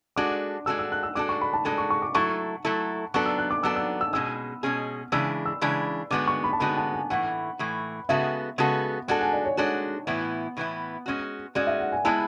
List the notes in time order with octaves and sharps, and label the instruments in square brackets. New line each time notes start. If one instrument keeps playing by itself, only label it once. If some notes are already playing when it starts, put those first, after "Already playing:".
[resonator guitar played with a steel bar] G#3 D4 F#4 A4 [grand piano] D6
[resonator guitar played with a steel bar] G#3 D4 F#4 A4 [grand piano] E6
[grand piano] E6
F#6
E6
[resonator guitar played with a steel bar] G#3 D4 F#4 A4 [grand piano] D6
[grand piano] C#6
B5
A5
[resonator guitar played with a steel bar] G#3 D4 F#4 A4 [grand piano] A5
[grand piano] C#6
C#6
D6
[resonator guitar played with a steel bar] F#3 A3 E4 A4 [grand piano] C#6
[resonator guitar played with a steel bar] F#3 A3 E4 A4
[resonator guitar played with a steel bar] F#3 B3 D4 A4 [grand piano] C#6
[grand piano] E6
F#6
D6
[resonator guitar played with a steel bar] F#3 B3 D4 A4 [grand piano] E6
[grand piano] E6
E6
[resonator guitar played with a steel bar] B2 G#3 C#4 G#4 [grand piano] E6
[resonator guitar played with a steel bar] B2 G#3 C#4 G#4
[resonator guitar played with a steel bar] C#3 E3 G#3 D4 [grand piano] E6
[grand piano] E6
[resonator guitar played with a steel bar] C#3 E3 G#3 D4
[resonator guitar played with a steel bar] D3 G#3 B3 F#4 [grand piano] D6
[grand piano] C#6
B5
A5
[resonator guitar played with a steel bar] D3 G#3 B3 F#4 [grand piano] B5
[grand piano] A5
G#5
[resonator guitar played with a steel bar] A2 E3 A3 [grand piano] F#5
[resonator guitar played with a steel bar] A2 E3 A3
[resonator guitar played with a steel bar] C#3 G#3 B3 F#4 A4 [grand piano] E5
[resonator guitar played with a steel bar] C#3 G#3 B3 F#4 A4
[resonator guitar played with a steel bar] G#3 D4 F#4 A4 [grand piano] F#5
[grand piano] G#5
D5
C#5
[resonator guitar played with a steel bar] G#3 D4 F#4 A4 [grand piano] C#5
[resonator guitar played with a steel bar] A2 E3 B3 E4
A2 E3 B3 E4
G#3 C#4 F#4
[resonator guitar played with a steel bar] G#3 C#4 F#4 [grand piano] D5
[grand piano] E5
F#5
G#5
[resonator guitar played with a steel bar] G#3 B3 E4 [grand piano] A5